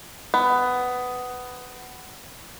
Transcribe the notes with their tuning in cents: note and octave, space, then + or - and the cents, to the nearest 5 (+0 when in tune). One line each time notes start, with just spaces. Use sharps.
B3 +15